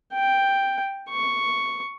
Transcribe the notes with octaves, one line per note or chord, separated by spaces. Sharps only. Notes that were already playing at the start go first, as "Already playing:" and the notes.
G5
C#6